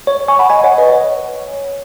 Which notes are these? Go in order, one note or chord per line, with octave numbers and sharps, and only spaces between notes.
C#5
G#5 C#6
F#5 B5
D#5 G#5
C#5 F#5
B4 D#5
C#5